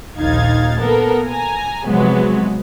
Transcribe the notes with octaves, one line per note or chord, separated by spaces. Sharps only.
A#1 D#2 D#4 F5 G#6 A6
A#3 B3 A4 A#4
G#5 A#5
C3 F3 F#3 G#3 B3